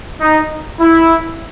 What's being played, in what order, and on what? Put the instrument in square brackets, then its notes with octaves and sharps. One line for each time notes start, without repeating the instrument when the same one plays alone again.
[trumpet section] D#4
E4